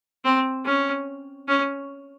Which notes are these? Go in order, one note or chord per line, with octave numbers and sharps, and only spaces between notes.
C4
C#4
C#4